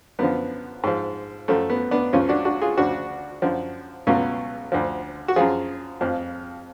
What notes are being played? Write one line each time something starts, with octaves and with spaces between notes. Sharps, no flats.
F#2 D3 F3 B3
G#2 F3
F#2 F3 A3
B3
B3 D4
C#2 C#3 F3 C#4 F4
D4 F#4
D4 F#4
F4 G#4
D2 C#3 F3 D4 F#4
F#2 D3 F3
C#2 B2 F#3 C#4 F4
D2 D3 F3
F#4
F#2 F3 F4 G#4
F2 F3